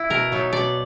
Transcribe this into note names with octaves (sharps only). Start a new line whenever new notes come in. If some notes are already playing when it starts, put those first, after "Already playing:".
Already playing: E4
B2 A#4
F#3 B3 D#4
B2 D5